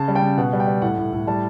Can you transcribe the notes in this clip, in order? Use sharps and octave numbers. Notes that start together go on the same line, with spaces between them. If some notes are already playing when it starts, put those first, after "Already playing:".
Already playing: C#3 A5
G3
G5
C#3
B2 F#5
G3
G5
G3
A2 F#5
A2
A2
G3 A5